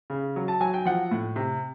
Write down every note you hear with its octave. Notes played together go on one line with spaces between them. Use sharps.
C#3
F#3
A5
F#3 G#5
G5
F3 F#5
A2
C3